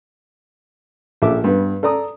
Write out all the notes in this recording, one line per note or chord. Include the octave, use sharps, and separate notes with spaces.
A#1 A4 E5 D6
G2 B3
A4 D5 A#5 D#6